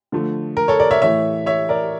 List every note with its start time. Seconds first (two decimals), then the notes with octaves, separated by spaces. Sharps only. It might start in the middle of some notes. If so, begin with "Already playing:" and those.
0.12 D3 F3 A3
0.57 A#4
0.68 A4 C#5
0.80 A#4 D5
0.91 C#5 E5
1.02 A2 E3 A3 C#5 E5
1.46 C#5 E5
1.69 A#4 D5